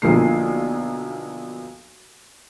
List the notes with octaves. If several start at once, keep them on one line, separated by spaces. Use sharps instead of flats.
B1 D3 F3 A#3 C7